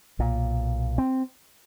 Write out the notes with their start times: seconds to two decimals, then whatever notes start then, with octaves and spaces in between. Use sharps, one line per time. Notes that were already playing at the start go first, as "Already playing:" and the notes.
0.19 B1 A#2
0.98 C4